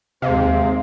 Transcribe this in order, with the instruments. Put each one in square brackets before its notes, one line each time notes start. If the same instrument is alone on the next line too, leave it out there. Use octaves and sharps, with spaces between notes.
[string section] D#2 G#3 C4 [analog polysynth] C3 [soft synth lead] F5